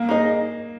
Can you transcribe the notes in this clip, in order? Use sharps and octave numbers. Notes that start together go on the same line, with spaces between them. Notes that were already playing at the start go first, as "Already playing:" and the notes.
Already playing: A#3
D#4 G#4 D#5